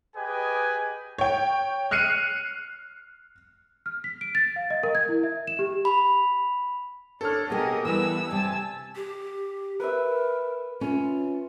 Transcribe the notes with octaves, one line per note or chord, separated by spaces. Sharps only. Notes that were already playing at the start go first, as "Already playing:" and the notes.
G4 G#4 B4 D#5 G5 G#5
C#5 G5
F6 F#6 C7 C#7 D#7
F6
B6
D7
A6
F5
D#5
A#4
G#6
E4
E5
E7
G4
B5
D4 A4 C#5 F6
B2 A#3 G4 G#4 A#4 D#5
E3 G3 B3 E4 E6
C3 G3 G#5 A5
G4
A#4 B4 E5
C#4 F4